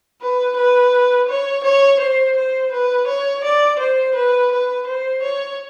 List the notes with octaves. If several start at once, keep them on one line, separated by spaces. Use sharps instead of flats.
B4
B4
C#5
C#5
C5
C5
B4
C#5
D5
C5
B4
B4
C5
C#5